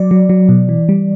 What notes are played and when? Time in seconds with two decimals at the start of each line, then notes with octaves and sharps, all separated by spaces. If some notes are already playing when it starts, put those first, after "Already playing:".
Already playing: F#3 D5
0.11 F#3
0.29 F#3
0.49 B2
0.69 E3
0.89 G3